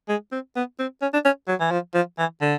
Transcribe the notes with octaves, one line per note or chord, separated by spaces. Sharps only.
G#3
C4
B3
C4
C#4
D4
C#4
F#3
E3
F3
F3
E3
D3